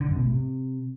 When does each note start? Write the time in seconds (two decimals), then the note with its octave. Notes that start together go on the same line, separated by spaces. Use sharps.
0.01 D3
0.08 F#2
0.15 B2
0.22 A2
0.30 C3